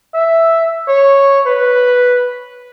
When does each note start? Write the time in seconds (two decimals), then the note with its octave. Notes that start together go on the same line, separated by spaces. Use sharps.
0.14 E5
0.88 C#5
1.46 B4